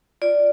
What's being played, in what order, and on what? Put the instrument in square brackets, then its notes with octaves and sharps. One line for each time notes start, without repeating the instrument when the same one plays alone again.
[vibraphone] F4 D5